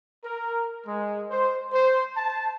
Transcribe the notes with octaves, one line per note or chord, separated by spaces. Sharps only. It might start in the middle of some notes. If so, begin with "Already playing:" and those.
A#4
G#3
C5
C5
A5